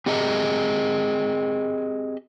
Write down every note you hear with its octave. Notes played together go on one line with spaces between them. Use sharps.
C4 G4 G#4 D#5 E5 A#5